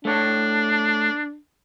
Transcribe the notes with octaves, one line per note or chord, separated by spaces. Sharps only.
A3 D4 C#5